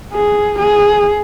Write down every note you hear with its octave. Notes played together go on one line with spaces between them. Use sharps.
G#4
G#4